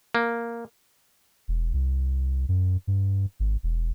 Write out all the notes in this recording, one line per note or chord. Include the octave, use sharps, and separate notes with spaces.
A#3
E1
C2
F#2
G2
G#1
E1